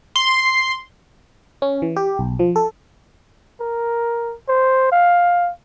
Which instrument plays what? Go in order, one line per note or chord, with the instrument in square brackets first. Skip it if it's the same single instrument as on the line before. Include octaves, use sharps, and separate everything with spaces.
[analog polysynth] C6
[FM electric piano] C#4
E3
G4
B1
F3
A4
[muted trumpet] A#4
C5
F5